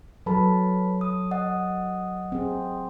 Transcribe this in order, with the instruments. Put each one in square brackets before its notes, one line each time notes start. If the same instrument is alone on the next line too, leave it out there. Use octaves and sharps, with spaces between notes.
[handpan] F#3 A4 [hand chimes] B4 A5 B5
[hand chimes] D#6
D#5 F#5 D#6
[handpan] C4 G#4